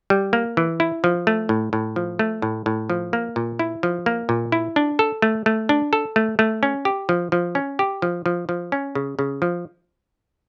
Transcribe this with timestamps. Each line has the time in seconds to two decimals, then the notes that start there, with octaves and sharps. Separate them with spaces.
0.10 G3
0.33 A#3
0.57 E3
0.80 E4
1.04 F3
1.27 A3
1.49 A2
1.73 A2
1.96 F3
2.19 A3
2.42 A2
2.66 A2
2.90 F3
3.13 A#3
3.36 A#2
3.59 E4
3.83 F3
4.06 A#3
4.29 A#2
4.52 E4
4.76 D4
4.99 A4
5.22 A3
5.46 A3
5.69 D4
5.93 A4
6.16 A3
6.39 A3
6.63 C#4
6.85 G4
7.09 F3
7.32 F3
7.55 C#4
7.79 G4
8.02 F3
8.26 F3
8.49 F3
8.72 C#4
8.95 C#3
9.19 C#3
9.42 F3